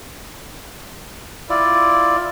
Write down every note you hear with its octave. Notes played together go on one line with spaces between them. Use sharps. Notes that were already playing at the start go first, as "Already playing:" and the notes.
E4 F4 D5